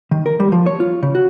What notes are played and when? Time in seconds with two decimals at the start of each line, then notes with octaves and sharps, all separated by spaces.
0.11 D#3
0.26 A#4
0.40 G3
0.52 F3
0.66 C#5
0.80 F4
1.03 C#3
1.15 F#4